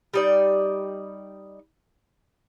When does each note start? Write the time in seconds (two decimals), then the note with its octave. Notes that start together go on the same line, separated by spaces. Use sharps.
0.14 G3 D#4 D5